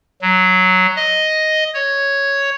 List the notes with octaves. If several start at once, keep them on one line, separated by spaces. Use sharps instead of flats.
F#3
D#5
C#5